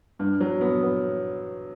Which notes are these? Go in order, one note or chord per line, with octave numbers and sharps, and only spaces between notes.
G2
F#3
B3
B3